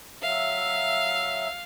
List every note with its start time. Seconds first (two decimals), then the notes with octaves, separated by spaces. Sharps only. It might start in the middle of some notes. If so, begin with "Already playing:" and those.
0.23 F#3 E5 F5